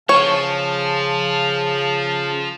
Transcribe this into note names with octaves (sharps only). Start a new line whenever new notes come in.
C#3 F3 C#5 F5 A5